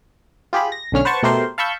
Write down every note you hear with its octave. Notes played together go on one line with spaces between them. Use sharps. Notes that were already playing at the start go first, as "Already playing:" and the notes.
F4 G4 G#4 B5
A#6
B1 D3 C#4 F6
B4 C5 F#5 A5 C#6
B2 A3 G4 A#4 C5 C6
F5 A5 B5 C#6 E6 G6